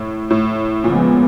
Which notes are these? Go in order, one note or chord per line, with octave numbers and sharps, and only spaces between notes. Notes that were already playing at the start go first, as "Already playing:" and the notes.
Already playing: A2
A2
A#2 C#3 F3 G#3 B3